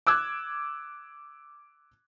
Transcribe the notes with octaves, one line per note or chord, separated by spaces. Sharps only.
D6 E6 F#6 G#6